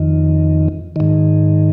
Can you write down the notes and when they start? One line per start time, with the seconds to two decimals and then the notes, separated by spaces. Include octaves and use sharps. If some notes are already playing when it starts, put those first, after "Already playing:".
Already playing: F2 D#3
0.96 G#2 D#3